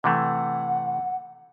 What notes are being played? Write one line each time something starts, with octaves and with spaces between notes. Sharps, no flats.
C3 E3 A3 F#5